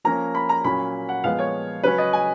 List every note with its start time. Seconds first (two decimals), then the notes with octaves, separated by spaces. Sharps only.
0.04 F3 A#3 C#4 A#5
0.35 B5
0.49 A#5
0.64 A#2 F#3 A#3 C#4 B5
1.09 F#5
1.24 A#2 F3 G#3 B3 F5
1.39 C#5
1.83 C#3 F#3 C#4 B4
1.98 D#5
2.13 G#5